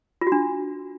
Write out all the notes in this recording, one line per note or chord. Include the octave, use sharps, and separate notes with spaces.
F4
F#4
D4